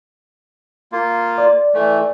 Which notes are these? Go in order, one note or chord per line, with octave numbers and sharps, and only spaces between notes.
A#3 F4
D5
E3 A3